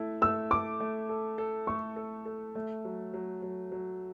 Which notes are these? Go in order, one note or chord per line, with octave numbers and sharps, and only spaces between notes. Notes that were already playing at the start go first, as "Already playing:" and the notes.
Already playing: A3 E4 A4
A3 E6
A4 D6
A3
A4
A4
A3 C#6
A4
A4
A3
F#3
F#3
F#3
F#3